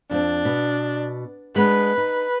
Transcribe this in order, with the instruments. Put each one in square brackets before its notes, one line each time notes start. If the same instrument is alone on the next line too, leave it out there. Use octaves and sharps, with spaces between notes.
[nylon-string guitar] F2 C4 [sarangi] D4
[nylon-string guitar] B2
[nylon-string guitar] G#3 B3 D4 [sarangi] B4
[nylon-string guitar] D#4